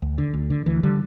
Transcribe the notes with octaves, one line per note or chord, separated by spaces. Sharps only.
D2
D3
D2
D3
D2 E3
D3 G3